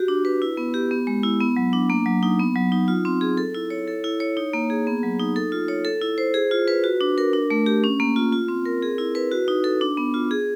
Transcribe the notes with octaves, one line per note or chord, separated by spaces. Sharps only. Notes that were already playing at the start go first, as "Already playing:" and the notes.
Already playing: F#4 G4
D4
B4
E4
B3
G4
B3
G#3
E4
B3
F#3
D4
A#3
F#3
D#4
B3
F#3
D#4
F4
C4
G#4
A4
E4
C#5
A4
E4
C#5
D#4
A#3
G#4
B3
F#3
D#4
A4
F4
C#5
A4
E4
C5
G#4
F4
B4
F#4
D4
A#4
D4
A3
G4
C#4
A#3
F4
F4
C4
A#4
G#4
E4
B4
F#4
D#4
A4
D4
B3
F4
G#4